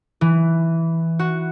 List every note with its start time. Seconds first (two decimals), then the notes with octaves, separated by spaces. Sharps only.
0.21 E3
1.19 F#4